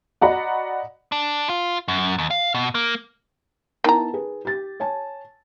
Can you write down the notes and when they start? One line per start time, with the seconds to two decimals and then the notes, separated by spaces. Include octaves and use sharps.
0.21 F#4 D5 D#5 F#5 A#5 B5
1.12 D4
1.49 F4
1.88 F#2
2.19 D#2
2.30 F5
2.54 B2
2.75 A#3
3.84 D#3 B3 E4 A5 A#5
4.14 G#4 B4
4.45 G4 A6
4.80 C#5 G#5 A5